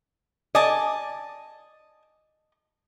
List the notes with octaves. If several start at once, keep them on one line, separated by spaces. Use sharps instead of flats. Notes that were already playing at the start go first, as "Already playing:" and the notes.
D5 D#5 G#5 A5